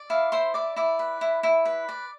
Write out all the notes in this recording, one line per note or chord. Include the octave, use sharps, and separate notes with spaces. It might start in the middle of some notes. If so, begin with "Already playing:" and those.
Already playing: D5
E4 F5
E4 C5 C6
E4 D5 D6
E4 D5 D6
B4
E4
E4
B4
D5